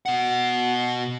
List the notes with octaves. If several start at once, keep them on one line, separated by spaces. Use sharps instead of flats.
B2 F#5